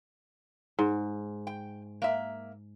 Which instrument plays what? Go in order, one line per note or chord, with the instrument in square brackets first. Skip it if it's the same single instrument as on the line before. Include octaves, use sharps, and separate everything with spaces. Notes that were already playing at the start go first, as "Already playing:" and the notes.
[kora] G#2
[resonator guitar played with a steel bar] G5
A#3 E5